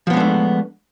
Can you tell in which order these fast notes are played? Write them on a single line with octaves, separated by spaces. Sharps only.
F3 B3 G#3 D4 A3